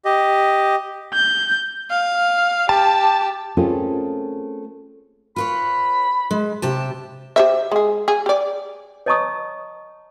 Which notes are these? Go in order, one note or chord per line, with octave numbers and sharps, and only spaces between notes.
G4 D#5
G6
F5
G4 A5
A3 C4 C#4 F4 G#4 A#4
F4 B4 C#5 B5
G#3
C3 G4 A5
G4 C5 E5
G#3 G#4
G#4
G4 D5
C#5 D#5 A5 A#5 C#6 D#6